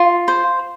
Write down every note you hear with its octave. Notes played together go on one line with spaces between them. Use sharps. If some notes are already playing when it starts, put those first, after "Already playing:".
Already playing: F4
C5